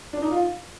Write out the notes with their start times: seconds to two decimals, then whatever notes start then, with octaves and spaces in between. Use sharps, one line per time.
0.13 D4
0.22 D#4
0.31 F4